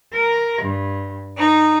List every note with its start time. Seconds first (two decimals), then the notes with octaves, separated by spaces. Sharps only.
0.14 A#4
0.63 G2
1.37 D#4